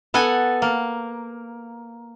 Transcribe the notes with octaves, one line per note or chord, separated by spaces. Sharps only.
B3 A4 F#5 G#5
A#3